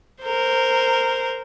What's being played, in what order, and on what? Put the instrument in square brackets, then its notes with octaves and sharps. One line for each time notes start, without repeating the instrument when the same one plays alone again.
[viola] A#4 C5